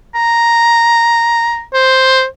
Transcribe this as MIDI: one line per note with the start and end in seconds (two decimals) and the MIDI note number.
0.15 1.62 82
1.73 2.24 72